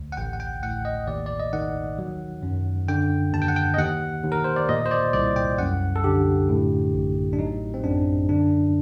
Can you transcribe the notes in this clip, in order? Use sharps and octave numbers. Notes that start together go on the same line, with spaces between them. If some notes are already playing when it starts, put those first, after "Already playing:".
Already playing: D2
F#5
A1 G5
F#5
G5
A2 F#5
D#5
D#2 D5
D5
D#5
D#3 F#5
F#3
F#2
D3 G5
D#2 A5
G5
F#5
G5
D#5
D#2 F#5
D#2
A#4
C5
D5
A#2 D#5
C5
D5
C2 D5
G5
F#2 F#5
A4
D3 G4
A2
A1
D4
F#3 D#4
C4
F#2 D4
D3 D4